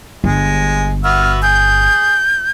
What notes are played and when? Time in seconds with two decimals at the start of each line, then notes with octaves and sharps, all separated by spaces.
0.24 G1 G#3
1.04 B3 F#4 E5 F6
1.43 G#4 G6